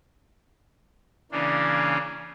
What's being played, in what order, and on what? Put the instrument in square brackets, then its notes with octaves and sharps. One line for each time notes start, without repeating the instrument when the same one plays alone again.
[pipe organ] C#3 E3 A#3 C#4 D4